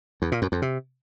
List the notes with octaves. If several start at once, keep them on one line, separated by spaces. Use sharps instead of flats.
E2
A#2
F#2
F2
C3